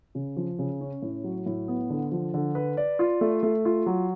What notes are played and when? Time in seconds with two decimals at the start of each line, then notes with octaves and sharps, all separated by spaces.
0.15 C#3
0.37 F3
0.59 C#3
0.81 C#4
1.02 A2
1.24 F#3
1.46 A2
1.68 B3
1.90 D3
2.12 F3
2.34 D3
2.55 B4
2.77 D5
2.99 F4
3.21 A3
3.43 A3
3.65 F4
3.86 F#3